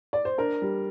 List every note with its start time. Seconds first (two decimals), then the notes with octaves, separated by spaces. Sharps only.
0.13 D5
0.25 C5
0.38 D4 A#4
0.62 G3